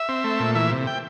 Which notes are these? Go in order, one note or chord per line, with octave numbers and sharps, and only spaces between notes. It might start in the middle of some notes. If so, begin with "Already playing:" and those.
Already playing: E5
C4
A3
A#2
E3 E5
C3
G5